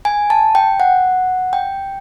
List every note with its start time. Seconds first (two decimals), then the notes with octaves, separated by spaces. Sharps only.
0.05 G#5
0.30 A5
0.55 G5
0.80 F#5
1.53 G5